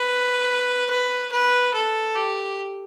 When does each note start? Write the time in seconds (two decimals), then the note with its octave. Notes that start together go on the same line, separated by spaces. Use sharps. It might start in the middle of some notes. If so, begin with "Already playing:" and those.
Already playing: B4
0.90 B4
1.32 B4
1.73 A4
2.16 G4